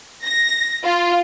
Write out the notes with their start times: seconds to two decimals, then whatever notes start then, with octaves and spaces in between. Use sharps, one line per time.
0.24 A#6
0.85 F4